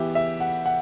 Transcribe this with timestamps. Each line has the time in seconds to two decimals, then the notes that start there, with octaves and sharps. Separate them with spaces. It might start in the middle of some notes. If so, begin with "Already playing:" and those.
Already playing: E3 B3 G4 E5
0.15 E5
0.40 F#5
0.66 F#5